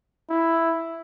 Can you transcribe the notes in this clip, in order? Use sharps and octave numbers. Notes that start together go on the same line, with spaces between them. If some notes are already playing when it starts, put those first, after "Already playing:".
E4